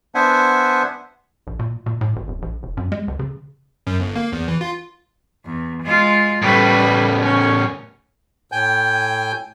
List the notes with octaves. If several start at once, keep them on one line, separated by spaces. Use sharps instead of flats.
B3 D4 C5 E5 F#5 G#5
A#1
A#2
A#2
A2
G#1
D1
A#1
F1
F#2
G#3
C#2
C#3
F#2
G1
A#3
E2
E3
F4
E2
G#3 F4
A2 C#3 G3 B4
C#4
A2 G5 G#5 G6